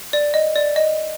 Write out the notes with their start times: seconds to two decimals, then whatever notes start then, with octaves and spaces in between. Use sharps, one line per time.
0.13 D5
0.34 D#5
0.56 D5
0.76 D#5